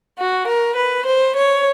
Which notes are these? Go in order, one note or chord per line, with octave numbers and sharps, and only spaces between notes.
F#4
A#4
B4
C5
C#5